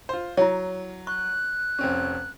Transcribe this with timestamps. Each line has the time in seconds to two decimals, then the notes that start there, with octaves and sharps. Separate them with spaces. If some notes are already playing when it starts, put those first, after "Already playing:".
0.09 F4 C5
0.37 F#3 E4 C#5
1.07 C#6 F#6
1.79 F1 C4 C#4